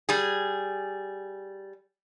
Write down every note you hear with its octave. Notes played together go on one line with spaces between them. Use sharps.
G3 G#4